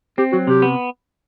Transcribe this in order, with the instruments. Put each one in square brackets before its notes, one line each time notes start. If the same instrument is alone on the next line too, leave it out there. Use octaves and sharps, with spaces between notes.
[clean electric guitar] C4 [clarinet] G4
[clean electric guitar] F#3 [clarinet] F#4
[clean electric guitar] C3 [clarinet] G4
[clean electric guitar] B3